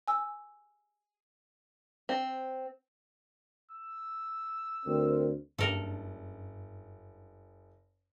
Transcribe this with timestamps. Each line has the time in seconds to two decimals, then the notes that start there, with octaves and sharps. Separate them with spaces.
0.08 G#5 E6
2.09 C4
3.72 E6
4.86 D2 C4 A#4
5.58 F#1 G2 A4 A#4